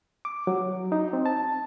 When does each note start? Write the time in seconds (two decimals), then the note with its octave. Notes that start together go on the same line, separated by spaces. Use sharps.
0.25 D6
0.47 F#3
0.92 D#4
1.13 C4
1.26 A5